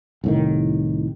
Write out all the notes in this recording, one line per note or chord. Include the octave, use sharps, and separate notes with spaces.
C2 A2 D#3